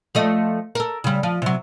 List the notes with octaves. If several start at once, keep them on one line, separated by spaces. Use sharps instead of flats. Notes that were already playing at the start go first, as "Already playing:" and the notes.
F3 A3 D#5
A4 A#4
C#3 G3
F3
C3 F#3